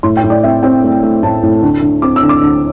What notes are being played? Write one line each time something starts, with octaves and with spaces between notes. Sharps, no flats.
A2 C6
G5
A2
D5
C4 E5
C4 G5
A3
A3
A2 A5
A2
D2
D2
C4 D6
E6
D2
D6
D2